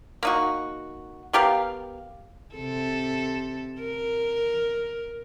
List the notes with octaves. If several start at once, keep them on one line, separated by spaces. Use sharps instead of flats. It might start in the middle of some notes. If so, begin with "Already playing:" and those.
A#3 D#4 F#4
B3 G4 A#4 F5
C3 A4
A#4